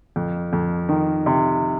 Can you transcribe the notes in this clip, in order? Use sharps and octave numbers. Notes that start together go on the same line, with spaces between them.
F2
F2
D#3
C3